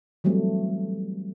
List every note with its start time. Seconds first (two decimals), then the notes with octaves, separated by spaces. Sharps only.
0.24 E3 F#3 G3 A3 C4